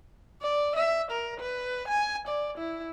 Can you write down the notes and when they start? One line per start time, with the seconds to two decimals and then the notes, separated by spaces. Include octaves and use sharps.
0.42 D5
0.76 E5
1.11 A#4
1.40 B4
1.88 G#5
2.27 D5
2.58 E4